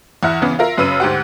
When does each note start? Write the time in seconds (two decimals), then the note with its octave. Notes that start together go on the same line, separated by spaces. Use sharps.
0.23 E2 E4 F#5 F6
0.42 C#3 E3 B3
0.59 F4 A#4 E5
0.78 F#2 C#3 B4 E6 F6 D#7
1.00 D2 G#2 G4 F#5